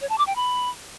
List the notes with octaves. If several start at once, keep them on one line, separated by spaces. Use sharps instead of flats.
C#5
A5
D6
G5
B5